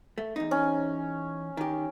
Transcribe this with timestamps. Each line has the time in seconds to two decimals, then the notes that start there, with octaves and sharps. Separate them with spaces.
0.18 A3
0.36 E2 D#4
0.51 C#4
1.57 D#3 G4